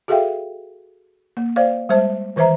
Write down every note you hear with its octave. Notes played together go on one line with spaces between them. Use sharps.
F#4 G#4 A4 E5 F5 G5
A#3
C5 D5 F5
G3 G#3 C5 E5 A5
D#3 E3 B4 C5 E5 A#5